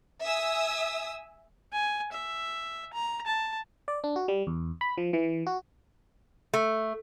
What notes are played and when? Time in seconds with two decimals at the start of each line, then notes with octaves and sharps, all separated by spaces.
0.25 E5 G#5 D#6 E6
1.73 G#5
2.12 E5
2.93 A#5
3.26 A5
3.88 D5
4.04 D4
4.16 F#4
4.28 G3
4.47 E2
4.81 B5
4.98 F3
5.13 E3
5.47 F#4
6.54 A3